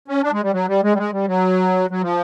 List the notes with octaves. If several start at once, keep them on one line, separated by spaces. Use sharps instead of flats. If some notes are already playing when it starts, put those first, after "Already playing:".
C#4
D4
G#3
G3
F#3
G3
G#3
G3
G#3
G3
F#3
F#3
F3